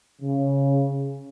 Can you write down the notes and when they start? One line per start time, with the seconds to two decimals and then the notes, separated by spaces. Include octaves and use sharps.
0.22 C#3